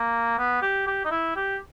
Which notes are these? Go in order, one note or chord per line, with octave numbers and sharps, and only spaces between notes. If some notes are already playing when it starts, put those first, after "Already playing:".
Already playing: A#3
B3
G4
G4
D#4
E4
G4